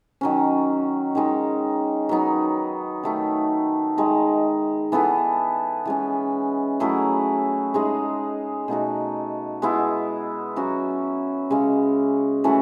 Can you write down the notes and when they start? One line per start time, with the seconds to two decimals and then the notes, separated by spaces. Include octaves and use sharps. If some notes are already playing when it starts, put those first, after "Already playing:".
0.21 D#3 F#3 C#4
1.15 D#3 G#3 D#4
2.09 F#3 B3 D#4
3.03 D#3 A3 D#4
3.98 D#3 G#3 D#4
4.92 E3 B3 E4 A4
5.85 E3 G#3 C#4
6.80 F#3 A3 E4 G#4
7.74 G#3 D#4 G#4
8.68 B2 A3 D#4 F#4
9.62 G#3 B3 E4
10.56 F#3 C#4 F#4
11.51 C#3 G#3 C#4
12.44 E3 A3 C#4 F#4